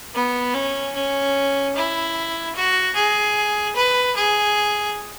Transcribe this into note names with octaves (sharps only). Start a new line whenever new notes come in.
B3
C#4
C#4
E4
F#4
G#4
B4
G#4